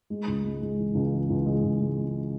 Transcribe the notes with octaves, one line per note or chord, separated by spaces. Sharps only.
G#3
C#2
G#3
G#3
E3
C#2
E3
C#2
G#3
C#2
G#3
C#3